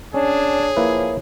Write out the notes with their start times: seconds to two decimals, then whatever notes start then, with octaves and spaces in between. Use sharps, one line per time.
0.14 C#4 D4 G#4 C#5
0.77 F3 A#3 E4 B4